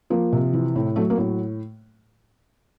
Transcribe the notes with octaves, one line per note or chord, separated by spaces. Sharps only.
F3 A#3
C3
E3
A2
F#3 A3
A#3
A2